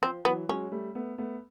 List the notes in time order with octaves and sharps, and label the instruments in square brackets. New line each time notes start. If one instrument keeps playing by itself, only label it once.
[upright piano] F3 [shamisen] C4
[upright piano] E3 F#3 [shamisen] B3
[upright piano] F#3 G#3 [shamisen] C#4
[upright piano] G3 A3
A3 B3
A3 B3